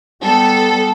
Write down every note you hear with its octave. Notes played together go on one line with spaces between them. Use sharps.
G3 B3 A4